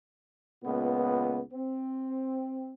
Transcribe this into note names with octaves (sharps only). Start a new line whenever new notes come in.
C#2 A#2 B3
C4